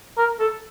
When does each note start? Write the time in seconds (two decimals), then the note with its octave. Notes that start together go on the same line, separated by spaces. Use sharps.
0.18 A#4
0.40 A4